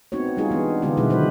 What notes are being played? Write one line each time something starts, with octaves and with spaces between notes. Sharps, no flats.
B3 C4 D#4 F#4 C#5
G3 G#3 D#4 F4 G#4
E3 G#3 B3 D4
D3 D#3 G#3 B3 F4 G4
B2 G3 G#3 E4 B4
D3 F#3 D4 E4 B4 C5